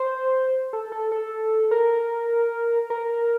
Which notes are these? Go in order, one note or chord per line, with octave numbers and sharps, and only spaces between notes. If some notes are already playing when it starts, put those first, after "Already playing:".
Already playing: C5
A4
A4
A4
A#4
A#4